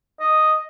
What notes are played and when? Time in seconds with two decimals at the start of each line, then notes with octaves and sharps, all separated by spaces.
0.20 D#5